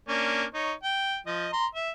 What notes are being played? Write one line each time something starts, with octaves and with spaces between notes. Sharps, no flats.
A#3 C#4 D4
D#4 C#5
G5
F3 D#5
A#5 C6
E5